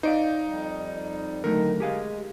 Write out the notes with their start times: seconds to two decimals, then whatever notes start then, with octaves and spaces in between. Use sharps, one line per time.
0.03 D#4 C5 D5 F5
0.46 F2 G3
1.44 D3 D#3 F#3 A3 D#4 A#4
1.80 G#3 G4 G#4 F5